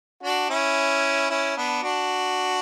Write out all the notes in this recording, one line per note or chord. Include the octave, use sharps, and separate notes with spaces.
D4 F#4
C#4 E4
C#4 E4
B3 D4
D4 F#4